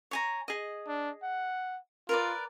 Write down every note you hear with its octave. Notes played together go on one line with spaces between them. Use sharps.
C#5 G#5 A#5
G#4 D#5
D4
F#5
F4 A#4 B4 D5